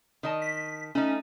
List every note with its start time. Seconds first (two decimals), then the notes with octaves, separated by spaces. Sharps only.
0.23 D#3 D#5 A5
0.42 B6
0.95 A3 C#4 D#4